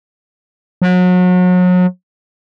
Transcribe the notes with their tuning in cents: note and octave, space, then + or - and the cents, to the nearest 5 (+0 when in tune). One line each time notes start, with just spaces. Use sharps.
F#3 -35